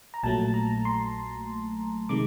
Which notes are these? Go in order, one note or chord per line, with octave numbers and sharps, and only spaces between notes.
A#5
A#1 A#2 F#3 A3 A5
A#5
C6
C3 D#3 G#3 D6